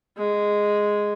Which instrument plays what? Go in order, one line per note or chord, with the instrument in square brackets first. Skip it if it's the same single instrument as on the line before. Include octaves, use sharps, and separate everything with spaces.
[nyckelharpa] G#3